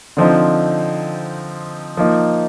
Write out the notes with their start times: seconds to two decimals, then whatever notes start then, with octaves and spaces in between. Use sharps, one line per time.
0.17 D3 F3 C4 D#4
1.97 F3 A#3 D#4